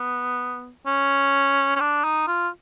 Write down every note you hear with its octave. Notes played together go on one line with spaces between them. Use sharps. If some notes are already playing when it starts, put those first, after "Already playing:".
Already playing: B3
C#4
C#4
D4
D#4
F4